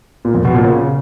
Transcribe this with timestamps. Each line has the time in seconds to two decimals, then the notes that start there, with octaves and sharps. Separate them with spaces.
0.25 A#2
0.35 F2
0.45 B2
0.54 A#2
0.64 C#3